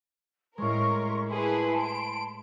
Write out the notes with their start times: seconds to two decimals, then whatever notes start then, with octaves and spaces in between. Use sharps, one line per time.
0.58 A2 G#3 C#4 A#4 C6 C#6
1.29 E4 G#4 B4 A5 B5 C6
1.80 D7